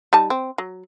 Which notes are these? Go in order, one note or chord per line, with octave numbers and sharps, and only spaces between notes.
G3 D#4 A5
C4
F#3